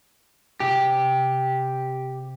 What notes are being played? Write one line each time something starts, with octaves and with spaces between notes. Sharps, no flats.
C3 G4